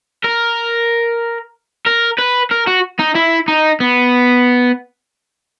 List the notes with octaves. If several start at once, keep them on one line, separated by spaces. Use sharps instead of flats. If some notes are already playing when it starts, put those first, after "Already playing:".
A#4
A#4
B4
A#4
F#4
D#4
E4
D#4
B3